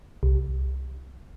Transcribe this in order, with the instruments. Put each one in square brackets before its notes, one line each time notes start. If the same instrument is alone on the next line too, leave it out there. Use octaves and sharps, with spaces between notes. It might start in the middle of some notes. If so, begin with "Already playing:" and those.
[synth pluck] C2